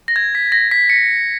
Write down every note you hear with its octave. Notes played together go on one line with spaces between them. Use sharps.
A#6
G#6
B6
A#6
B6
C#7